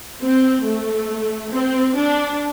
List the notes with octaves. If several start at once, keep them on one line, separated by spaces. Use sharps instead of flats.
C4
A3
C4
D4